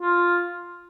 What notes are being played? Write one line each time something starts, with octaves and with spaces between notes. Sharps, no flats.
F4